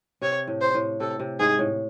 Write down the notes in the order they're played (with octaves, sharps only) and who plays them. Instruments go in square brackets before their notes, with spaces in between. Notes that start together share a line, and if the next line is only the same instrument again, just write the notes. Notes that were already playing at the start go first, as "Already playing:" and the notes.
[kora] C3 [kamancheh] C#5
[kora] A2
[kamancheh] C5
[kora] A2
[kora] C3 [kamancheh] A4
[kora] C3
[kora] G#2 [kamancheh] G#4
[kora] A2